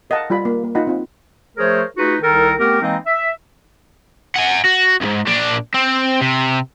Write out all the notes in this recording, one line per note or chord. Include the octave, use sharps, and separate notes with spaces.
A#4 D#5 F5 F#5 A5
G3 F4 D5 B5
A#3
A#3
D#4 F4 D#5 F#5 B5
C4 D#4 F4
F3 A3 G#4 A#4 C5 C#5
A3 D#4 F4 F#4 G#4 B4
C2 D#3 D#4 A4 A#4
A3 B3 C4 G4 A#4
E3 G#3 A#3 C4 D#4
E5
F#5 G#5
F#4
C2 G#2
A#2 D4
C4
C3